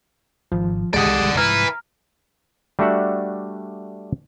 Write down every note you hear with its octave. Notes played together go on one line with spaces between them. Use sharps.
G#1 F3
G#1 C#2 G#2 G#3 G4 D5 F#5 D#6
C2 E3
D1 C2 G3
C2 G#2 F3 E4 B4 A#5 F6
G3 A3 D4 F#4 E5 F#5